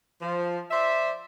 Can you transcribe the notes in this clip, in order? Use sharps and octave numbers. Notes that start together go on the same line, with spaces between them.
F3
C5 D5 E5